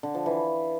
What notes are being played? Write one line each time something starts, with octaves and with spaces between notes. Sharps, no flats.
D3
F3
E3